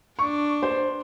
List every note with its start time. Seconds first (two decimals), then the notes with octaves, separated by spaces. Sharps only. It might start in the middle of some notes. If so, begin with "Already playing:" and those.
0.19 D4 C#6
0.63 C5